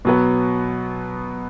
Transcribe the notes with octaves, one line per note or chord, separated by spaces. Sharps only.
B2 F#3 B3